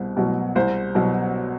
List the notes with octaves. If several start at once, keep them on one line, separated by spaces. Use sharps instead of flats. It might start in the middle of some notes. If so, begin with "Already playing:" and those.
Already playing: C2 B2 C5
B2 F#3
C2 C5
B2 F#3